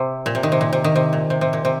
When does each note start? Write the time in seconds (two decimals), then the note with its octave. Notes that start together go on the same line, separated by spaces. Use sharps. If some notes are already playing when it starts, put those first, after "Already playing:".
Already playing: C3
0.26 A#2
0.35 C3
0.43 D#3
0.52 C3
0.61 A#2
0.73 C3
0.84 D#3
0.96 C3
1.13 A#2
1.30 C3
1.41 C3
1.53 A#2
1.65 C3